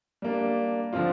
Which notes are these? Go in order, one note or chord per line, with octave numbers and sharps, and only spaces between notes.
G3 A#3 D4
D3 F3 C4 F4